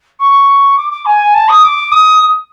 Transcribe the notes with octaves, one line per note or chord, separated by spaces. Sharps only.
C#6
D6
D6
G#5
A5
D#6
D6
D#6